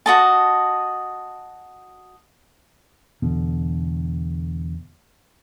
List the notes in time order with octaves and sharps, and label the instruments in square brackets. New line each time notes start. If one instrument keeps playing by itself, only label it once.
[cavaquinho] F#4 D#5 A5
[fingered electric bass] E2 B2 D3